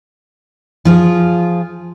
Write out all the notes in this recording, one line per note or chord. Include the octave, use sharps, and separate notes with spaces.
F3 F4 G#4